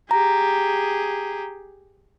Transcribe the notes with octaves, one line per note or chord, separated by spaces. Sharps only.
G4 G#4 A#5